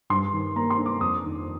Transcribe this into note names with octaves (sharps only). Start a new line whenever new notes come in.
G2 C6
D#3
A#3 A#5
C6
D4
D6
F2 D#6
D#3